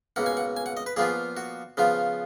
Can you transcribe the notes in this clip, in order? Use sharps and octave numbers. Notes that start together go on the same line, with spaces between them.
C#2 B2 A#3 F#5
G#5
F#5
G#5
F#5
D#5
B4
A#2 F3 B3 F4 G#4
F#4
C#3 F3 B3 F4